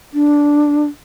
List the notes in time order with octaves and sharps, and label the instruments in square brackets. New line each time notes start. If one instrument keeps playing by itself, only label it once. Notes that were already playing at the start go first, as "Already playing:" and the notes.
[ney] D4